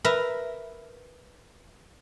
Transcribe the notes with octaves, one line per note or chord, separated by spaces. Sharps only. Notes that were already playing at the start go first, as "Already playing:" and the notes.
A#4 B4 E5